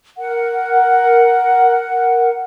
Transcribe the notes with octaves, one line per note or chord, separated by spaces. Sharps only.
A#4 F#5